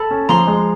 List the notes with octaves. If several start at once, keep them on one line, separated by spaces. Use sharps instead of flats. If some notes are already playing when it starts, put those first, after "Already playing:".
Already playing: A4 A5 B5
C#4
F3 A#5 C6
G#3